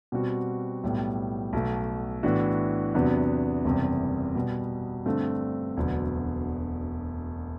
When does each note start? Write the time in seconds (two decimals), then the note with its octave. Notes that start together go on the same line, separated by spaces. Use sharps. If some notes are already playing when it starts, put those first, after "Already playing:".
0.12 B2 G3 C4 F#4
0.83 B1 A2 G3 B3
1.53 B1 B2 A3
2.23 A2 E3 B3 D4 F#4
2.95 E2 C3 F#3 B3 D4
3.65 F#1 E2 C3 G3
4.35 B2 G3 B3
5.06 G2 D3 A3 C4
5.77 E1 D2 D3 F#3 B3